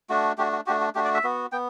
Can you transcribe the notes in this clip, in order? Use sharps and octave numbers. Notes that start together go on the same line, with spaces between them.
A3 D4 F#4
A3 D4 F#4 G4
F#4
A3 D4 F#4 G4
F#4
A3 D4 F#4 G4
D5
E5
B3 F#4
B3 G5